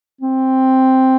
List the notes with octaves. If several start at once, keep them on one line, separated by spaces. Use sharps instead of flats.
C4